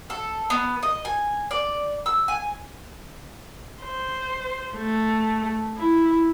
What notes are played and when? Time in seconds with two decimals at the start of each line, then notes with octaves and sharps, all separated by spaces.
0.10 A4
0.50 B3
0.83 D#5
1.05 G#5
1.51 D5
2.06 E6
2.28 G#5
3.82 C5
4.75 A3
5.77 E4